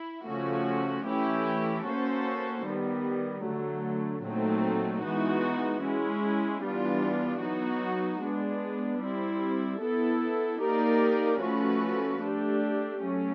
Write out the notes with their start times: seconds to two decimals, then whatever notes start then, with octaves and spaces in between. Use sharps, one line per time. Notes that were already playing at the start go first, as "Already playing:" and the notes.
Already playing: E4
0.26 C#3 F3 A3 C#4 F#4
1.06 E3 A3 C#4 E4 G4
1.85 A#3 C#4 F#4 A4 C5
2.65 D#3 G3 B3
3.44 D3 F#3 A3
4.24 A#2 F#3 A3 C4 D#4
5.04 E3 G#3 B3 D#4 F#4
5.83 G#3 C#4 E4
6.63 E3 G3 B3 D4 F4
7.42 F#3 B3 D#4 F#4
8.22 G#3 B3 D4
9.01 G3 C4 E4
9.82 B3 E4 A4
10.61 A#3 D#4 G4 A#4 D5
11.41 F3 A3 C#4 F#4 B4
12.20 A3 D4 G4
12.99 F#3 A3 C#4